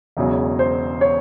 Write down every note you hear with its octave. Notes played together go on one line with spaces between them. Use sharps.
E1 E2 C#3 F#3
C5
C#5